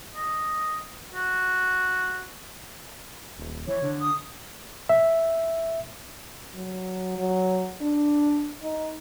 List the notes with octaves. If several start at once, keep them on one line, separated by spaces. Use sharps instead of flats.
D#5
F#4
D#1
E3 C#5
D3
D#6
E5
F#3
F#3
D4
D#4